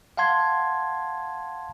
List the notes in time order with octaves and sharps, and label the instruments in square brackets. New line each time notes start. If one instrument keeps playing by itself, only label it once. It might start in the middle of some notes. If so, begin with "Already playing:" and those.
[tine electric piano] F5 F#5 A5 C6 G#6